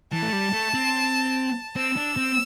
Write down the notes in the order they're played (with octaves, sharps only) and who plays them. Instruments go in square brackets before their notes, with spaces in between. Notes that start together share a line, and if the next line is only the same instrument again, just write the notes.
[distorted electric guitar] E3 [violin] A5
[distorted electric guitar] A3
G3
A3
C4
[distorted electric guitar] C4 [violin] E6
[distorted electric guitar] D4
C4